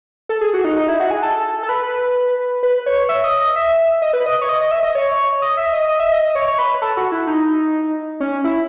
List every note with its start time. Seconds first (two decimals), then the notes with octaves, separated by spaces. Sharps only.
0.29 A4
0.41 G#4
0.54 F#4
0.64 D#4
0.77 D#4
0.88 E4
1.00 F#4
1.11 G#4
1.22 A4
1.63 A4
1.69 B4
2.63 B4
2.86 C#5
3.09 E5
3.24 D#5
3.40 D#5
3.56 E5
4.02 D#5
4.13 B4
4.26 D#5
4.41 C#5
4.49 D#5
4.61 D#5
4.71 E5
4.83 D#5
4.95 C#5
5.42 D#5
5.57 E5
5.73 D#5
5.88 D#5
6.00 E5
6.12 D#5
6.23 D#5
6.35 C#5
6.47 C#5
6.59 B4
6.82 A4
6.97 F#4
7.12 E4
7.27 D#4
8.20 C#4
8.44 E4